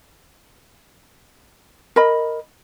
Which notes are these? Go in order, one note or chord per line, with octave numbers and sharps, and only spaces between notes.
A#4 D#5 B5